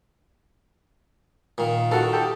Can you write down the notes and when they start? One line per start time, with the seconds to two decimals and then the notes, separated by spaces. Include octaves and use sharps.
1.58 A#2 D#3
1.92 D#3 F#4 A4
2.13 G4 A4